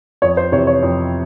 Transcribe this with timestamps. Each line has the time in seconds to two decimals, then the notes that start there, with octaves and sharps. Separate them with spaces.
0.22 F2 C#5
0.37 C5
0.52 C3 E3 C#5
0.67 C#5
0.83 F2